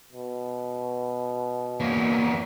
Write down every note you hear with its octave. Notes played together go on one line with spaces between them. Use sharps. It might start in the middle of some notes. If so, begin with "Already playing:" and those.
B2
E2 A#3